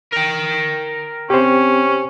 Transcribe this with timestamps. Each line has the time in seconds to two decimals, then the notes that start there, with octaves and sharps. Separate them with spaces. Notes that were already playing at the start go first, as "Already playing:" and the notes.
0.12 A#4 G5
1.30 C4 C#4 G4 C5